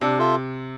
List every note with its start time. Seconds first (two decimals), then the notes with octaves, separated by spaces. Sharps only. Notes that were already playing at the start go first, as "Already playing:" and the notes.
0.01 C3 D4
0.19 F4 A4 E5